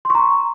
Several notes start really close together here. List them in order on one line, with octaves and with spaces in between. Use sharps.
C6 C#6 A#5